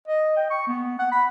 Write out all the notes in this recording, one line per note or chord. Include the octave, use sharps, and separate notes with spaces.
D#5
G5
C#6
B3
F#5
B5